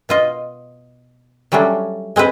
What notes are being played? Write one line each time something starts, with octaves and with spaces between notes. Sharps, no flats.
B2 F4 D#5
F#3 G3 A3 C#4 D4
G#3 C4 G#4 B4